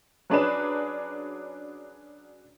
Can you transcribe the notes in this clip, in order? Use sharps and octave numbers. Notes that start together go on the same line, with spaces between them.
F#3 C#4 D4 G#4 B4 E7